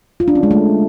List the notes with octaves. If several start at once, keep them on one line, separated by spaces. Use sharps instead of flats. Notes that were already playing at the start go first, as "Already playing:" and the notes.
F4
D4
C#4
G#3
A3